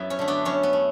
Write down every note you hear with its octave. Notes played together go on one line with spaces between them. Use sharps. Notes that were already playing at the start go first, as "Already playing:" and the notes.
Already playing: F#2 B3 E4
C#4
D3 A3
B3 D4
F#2 C#4
B3
A3